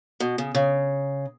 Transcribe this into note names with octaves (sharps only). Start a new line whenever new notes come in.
B2
C#3
C#3